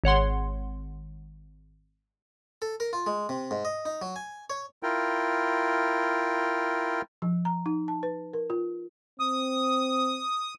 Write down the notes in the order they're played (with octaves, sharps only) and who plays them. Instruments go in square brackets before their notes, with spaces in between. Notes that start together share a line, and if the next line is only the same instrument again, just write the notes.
[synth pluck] G#1 C#5 F#5 C6
[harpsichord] A4
A#4
F4
G#3
C3
G#2
D#5
D#4
F#3
G#5
C#5
[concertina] E4 F4 A#4 G5
[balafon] F3
A#5
D#4
A5
B4
A#4
F4
[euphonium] C4 [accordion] D#6